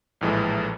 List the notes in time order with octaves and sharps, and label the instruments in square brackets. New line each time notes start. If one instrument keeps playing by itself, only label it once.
[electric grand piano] A#1 A2 E3 G#3